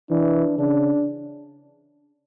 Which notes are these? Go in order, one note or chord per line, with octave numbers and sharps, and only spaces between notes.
E3 D4
C#3 D4